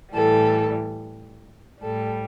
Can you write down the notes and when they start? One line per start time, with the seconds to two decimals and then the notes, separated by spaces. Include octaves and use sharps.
0.12 A2 E3 G3 A4
1.82 A2 G3 A4